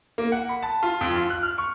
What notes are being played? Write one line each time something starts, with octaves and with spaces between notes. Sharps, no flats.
A#3
F#5
B5
A5
F4
F2
F4
F#6
F6
C#6